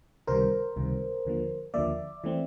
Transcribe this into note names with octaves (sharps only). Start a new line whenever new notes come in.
C#2 C3 D#3 G3 A#4 C5
C#2 C3 D#3 G3
D#2 D3 F3 A#3
D#2 D3 F3 A#3 D5 E5
E3 A3 C4